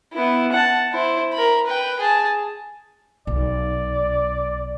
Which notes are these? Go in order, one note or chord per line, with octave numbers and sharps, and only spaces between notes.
B3 E4
F#5 A5
E4 C5
A#4 B5
B4 G5
G#4 A5
B1 D5